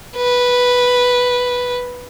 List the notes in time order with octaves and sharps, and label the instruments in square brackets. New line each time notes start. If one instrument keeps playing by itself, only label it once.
[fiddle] B4